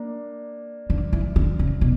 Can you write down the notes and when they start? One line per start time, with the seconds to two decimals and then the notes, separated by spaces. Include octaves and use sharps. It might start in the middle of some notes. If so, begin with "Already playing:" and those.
Already playing: A#3 D4
0.90 D3
1.13 E3
1.36 D3
1.59 C#3
1.81 B2